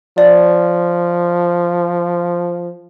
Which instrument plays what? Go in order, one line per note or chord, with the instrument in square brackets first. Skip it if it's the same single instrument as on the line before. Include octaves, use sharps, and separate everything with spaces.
[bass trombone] F3 [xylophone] D5